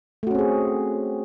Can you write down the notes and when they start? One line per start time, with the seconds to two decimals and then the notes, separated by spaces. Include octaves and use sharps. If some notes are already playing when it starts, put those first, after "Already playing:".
0.23 A3
0.27 F#4
0.31 C#4
0.35 C4
0.38 G#4